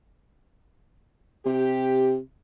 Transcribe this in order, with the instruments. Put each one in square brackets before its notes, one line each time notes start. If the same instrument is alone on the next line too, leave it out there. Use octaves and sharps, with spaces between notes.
[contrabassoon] C3 [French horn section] G4